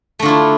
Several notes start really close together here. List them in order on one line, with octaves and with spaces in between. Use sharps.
A3 D3 F4 E4